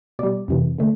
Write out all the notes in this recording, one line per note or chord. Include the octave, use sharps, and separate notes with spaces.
B2 G3 D5
F2 C3 E3
D3 A3